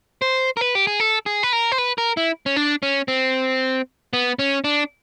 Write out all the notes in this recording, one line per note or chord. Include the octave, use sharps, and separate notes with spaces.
C5
A#4
B4
G4
G#4
A4
G#4
B4
A#4
C5
B4
A#4
E4
C#4
D4
C#4
C4
B3
C#4
D4